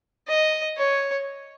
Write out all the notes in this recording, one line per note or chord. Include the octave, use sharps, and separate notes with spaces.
D#5
C#5